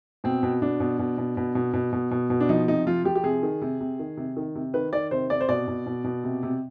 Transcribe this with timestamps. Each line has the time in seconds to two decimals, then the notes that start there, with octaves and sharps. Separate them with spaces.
0.24 B2 C4
0.43 B2
0.62 B2 D4
0.80 B2
0.99 B2
1.18 B2
1.37 B2
1.55 B2
1.74 B2
1.93 B2
2.11 B2
2.30 B2
2.40 D4
2.49 F3 D#4
2.68 C3 D#4
2.87 F3 F4
3.05 F3 G4
3.15 G4
3.23 C3 G#4
3.43 D#3
3.61 C3
3.80 C3
3.99 D#3
4.17 C3
4.37 D#3
4.55 C3
4.74 D#3 B4
4.93 D#3 D5
5.11 C3 C5
5.30 C3 D5
5.41 C5
5.48 B2 D5
5.68 B2
5.86 B2
6.04 B2
6.24 C3
6.43 C3